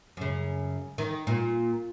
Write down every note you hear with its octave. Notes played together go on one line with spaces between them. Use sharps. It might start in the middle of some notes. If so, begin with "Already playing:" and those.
F#2 C#3
D#3
A#2